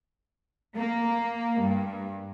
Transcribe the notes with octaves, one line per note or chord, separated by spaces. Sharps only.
A#3
G2